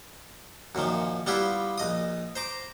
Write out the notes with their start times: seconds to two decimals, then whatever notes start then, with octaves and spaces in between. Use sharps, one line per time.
0.75 F#2 A#2 D#3 F3
1.27 G3 B3 E4 F4 G4
1.78 A#1 D#5 D#6
2.36 C5 A#5 D6